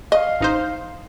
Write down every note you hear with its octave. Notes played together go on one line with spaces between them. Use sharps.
D#5 F5
A1 D#4 C5